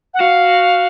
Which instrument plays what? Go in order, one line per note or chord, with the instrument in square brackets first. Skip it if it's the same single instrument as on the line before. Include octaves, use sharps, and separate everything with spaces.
[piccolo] F#5
[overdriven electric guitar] F#4 [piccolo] F5